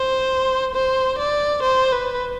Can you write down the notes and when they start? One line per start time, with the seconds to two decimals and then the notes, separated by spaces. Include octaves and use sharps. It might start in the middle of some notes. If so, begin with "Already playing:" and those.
Already playing: C5
0.75 C5
1.18 D5
1.63 C5
1.93 B4